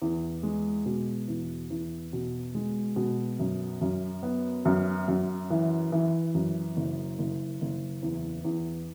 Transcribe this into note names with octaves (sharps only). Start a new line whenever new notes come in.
E2
G#3
B2
E2
E2
B2
G#3
B2
F#2
F#2
B3
F#2
F#2
E3
E3
F#2
F#1
F#1
F#1
E2
E2